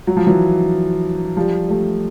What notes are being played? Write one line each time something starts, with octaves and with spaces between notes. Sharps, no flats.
F#3
F3
E3 F#3
F3 G3
G3 A3